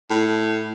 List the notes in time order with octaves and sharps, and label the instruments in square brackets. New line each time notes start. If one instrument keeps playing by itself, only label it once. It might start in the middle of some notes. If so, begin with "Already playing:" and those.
[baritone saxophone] A2